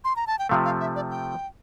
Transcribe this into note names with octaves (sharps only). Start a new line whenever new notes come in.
C6
A#5
A5
G5
C3 F3 A3 F5
F5
E5
D5
G5